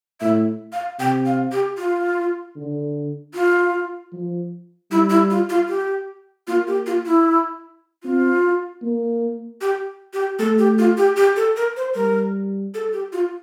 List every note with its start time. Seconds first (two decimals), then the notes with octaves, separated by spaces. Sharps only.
0.20 A2 E5
0.73 F5
0.99 C3 G5
1.26 F5
1.52 G4
1.78 F4
2.56 D3
3.34 F4
4.12 F3
4.91 G3 E4
5.10 E4
5.30 F4
5.50 F4
5.69 G4
6.47 A#3 F4
6.67 G4
6.86 F4
7.07 E4
8.03 C4 F4
8.82 A#3
9.61 G4
10.13 G4
10.39 A3 A4
10.59 G4
10.79 F4
10.97 G4
11.17 G4
11.36 A4
11.57 A#4
11.77 C5
11.95 G3 A#4
12.74 A4
12.93 G4
13.13 F4